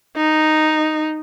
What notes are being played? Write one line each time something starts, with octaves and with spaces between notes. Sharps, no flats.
D#4